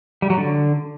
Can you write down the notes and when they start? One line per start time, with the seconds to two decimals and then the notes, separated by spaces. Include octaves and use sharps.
0.22 G3
0.30 F#3
0.38 D3